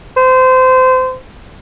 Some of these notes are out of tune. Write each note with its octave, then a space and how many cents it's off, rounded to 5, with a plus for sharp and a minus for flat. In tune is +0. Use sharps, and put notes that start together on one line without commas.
C5 -25